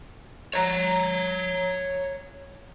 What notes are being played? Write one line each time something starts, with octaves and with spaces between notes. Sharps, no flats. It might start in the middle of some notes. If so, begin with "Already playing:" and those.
C#5 A#5